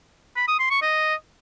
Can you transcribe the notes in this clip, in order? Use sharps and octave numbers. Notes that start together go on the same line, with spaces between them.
B5
D#6
C6
C#6
D#5